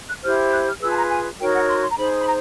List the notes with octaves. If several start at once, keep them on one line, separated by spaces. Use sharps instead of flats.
F#6
E4 G4 C5 F6
F#6
F6
F4 G#4 B4 E6
A5
A#5
G#5
D#4 F#4 A#4 C#5 G5
F#5
C6
C6
A#5
D#4 G#4 C5 B5
B5
A#5